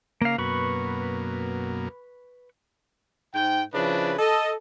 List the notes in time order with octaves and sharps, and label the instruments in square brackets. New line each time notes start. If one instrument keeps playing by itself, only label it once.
[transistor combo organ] C#3 A#4 [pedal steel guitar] A#3 F5
[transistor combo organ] F#2 B2 A#3 [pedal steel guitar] B4 B5 C#6
[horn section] G#2 G5
C#3 F3 D4 E4 B4
A4 D#5